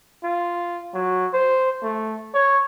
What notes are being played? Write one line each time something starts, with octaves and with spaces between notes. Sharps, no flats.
F4
F#3
C5
A3
C#5